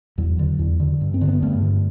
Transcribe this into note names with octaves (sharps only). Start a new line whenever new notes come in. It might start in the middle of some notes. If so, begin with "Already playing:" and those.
E2 F#3
D3
E2
D3
G2
C4
D3
B3
G2 A3
D3